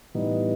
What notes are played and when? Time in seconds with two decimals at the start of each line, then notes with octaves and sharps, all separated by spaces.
0.15 A2 E3 G3 B3 D#4